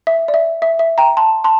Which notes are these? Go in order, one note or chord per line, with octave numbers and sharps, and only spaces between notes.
E5
D5
E5
E5
E5
G5 A#5
A5 C6
A5 C6